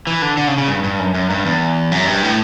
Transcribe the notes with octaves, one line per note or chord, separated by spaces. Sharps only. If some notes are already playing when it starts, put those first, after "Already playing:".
E3
D3
D3
C#3
C#3
G2
G2
F#2
F#2
G2
E2
F#2
G2
A2